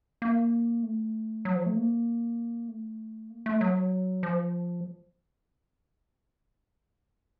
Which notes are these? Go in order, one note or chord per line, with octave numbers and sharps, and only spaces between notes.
A#3
A3
F#3
F3
A3
A#3
A3
A#3
A3
F#3
F3